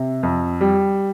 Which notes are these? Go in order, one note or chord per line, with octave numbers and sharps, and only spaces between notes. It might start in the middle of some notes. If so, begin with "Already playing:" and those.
Already playing: C3
F2
G3